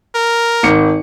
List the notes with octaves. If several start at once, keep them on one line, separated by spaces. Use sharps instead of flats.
A#4
G#1 C#7